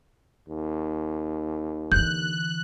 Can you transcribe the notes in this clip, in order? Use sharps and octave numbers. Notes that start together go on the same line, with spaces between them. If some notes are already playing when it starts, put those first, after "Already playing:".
D#2
D3 E3 F#6 G6